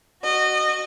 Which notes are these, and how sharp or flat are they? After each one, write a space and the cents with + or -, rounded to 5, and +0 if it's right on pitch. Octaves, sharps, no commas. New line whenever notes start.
F#4 +10 D#5 -25